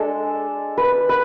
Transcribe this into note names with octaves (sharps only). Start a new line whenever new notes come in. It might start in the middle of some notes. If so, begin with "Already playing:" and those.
Already playing: G#3 D4 A4
B4
B4